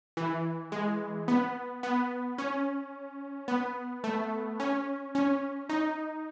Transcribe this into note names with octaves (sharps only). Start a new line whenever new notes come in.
E3
G#3
B3
B3
C#4
B3
A3
C#4
C#4
D#4